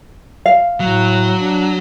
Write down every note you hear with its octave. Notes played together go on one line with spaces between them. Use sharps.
F5
A2 F#3
D4